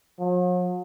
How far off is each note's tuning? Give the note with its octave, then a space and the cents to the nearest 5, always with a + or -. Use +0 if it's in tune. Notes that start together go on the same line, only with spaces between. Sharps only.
F#3 -45